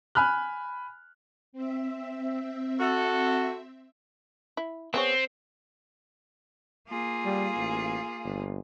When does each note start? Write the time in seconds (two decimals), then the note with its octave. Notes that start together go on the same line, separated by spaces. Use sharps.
0.15 G#5 B5 F6 F#6
1.53 C4 E5
2.79 F#4 A4
4.57 E4
4.94 B3 C4 G#4 C#5
6.87 A#3 F4 G#4
7.25 G3
7.57 A1
8.25 G1